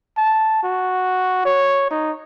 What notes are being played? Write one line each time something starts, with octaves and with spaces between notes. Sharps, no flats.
A5
F#4
C#5
D#4